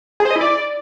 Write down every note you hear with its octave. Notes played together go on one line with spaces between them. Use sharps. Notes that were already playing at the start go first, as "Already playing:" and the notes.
G#4
C5
D#5
E4
D5